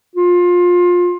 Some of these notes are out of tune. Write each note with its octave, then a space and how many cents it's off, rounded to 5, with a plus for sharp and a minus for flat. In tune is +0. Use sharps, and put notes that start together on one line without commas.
F4 +20